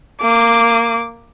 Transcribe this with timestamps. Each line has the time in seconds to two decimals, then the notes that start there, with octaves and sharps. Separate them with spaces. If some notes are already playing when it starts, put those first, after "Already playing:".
0.21 A#3 D6